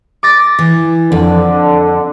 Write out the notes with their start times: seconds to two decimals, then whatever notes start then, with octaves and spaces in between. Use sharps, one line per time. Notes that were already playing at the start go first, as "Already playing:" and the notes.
0.23 D6 A6 A#6
0.59 E3
1.12 F2 D3